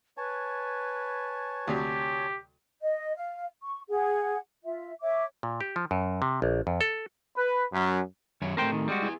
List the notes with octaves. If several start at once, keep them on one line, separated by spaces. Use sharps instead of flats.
B4 C#5 G#5 A5
D2 C3 F#3 G4
D#5
F5
C#6
G#4 F#5
F4 E5
C#5 E5 D6
A#2
G4
F3
F#2
C3
A#1
F2
A4
B4
F#2
F#2 D#3 C#4 C#5
A2 A3 C4 A#4 C5 G5
D#3
G3 G#3 F#4
E4 G#4